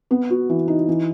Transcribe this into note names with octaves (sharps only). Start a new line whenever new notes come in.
B3
F#4
E3
D#4
E3